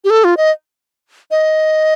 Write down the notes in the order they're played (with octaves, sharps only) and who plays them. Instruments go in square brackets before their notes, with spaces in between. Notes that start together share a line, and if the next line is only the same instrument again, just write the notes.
[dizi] G4
A4
F4
D#5
D#5